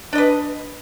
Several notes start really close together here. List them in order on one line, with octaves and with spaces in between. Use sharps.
D4 D#5 B4